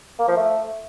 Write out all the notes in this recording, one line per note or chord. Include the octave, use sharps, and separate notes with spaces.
A#3
F3
A3